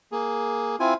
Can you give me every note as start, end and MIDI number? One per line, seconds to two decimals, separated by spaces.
0.12 0.76 58
0.12 0.76 68
0.80 0.94 60
0.80 0.94 64
0.80 0.94 65
0.80 0.94 80